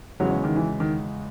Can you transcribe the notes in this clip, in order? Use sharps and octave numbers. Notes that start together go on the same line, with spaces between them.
E2 C#3 F#3 G#3 C#4 F#4
F#3
D#3
E3
D#3